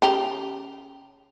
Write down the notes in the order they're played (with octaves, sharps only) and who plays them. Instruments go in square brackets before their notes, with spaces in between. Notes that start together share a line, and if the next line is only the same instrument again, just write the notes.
[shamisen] C#3 G4 A#5